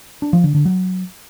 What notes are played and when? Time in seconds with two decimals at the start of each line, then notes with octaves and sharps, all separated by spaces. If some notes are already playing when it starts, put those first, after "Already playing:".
0.22 D4
0.33 F3
0.44 D3
0.55 D3
0.65 F#3